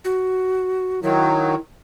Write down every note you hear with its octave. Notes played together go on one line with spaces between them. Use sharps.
F#4
D#3 F#3 E4